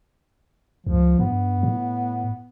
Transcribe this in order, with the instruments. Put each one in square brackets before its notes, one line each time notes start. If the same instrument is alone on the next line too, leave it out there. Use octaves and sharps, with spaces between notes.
[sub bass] C#2 [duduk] F3
[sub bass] G2 [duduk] B3
[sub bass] A2